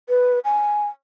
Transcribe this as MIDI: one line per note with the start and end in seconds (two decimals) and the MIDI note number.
0.09 0.39 71
0.44 0.87 80